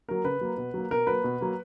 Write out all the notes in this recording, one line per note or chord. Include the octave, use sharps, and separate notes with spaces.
F#3 A#3 A#4
C#3 B4
F#3 A#3
B2
F#3 A#3
B2 A#4
F#3 A#3 B4
B2
F#3 A#3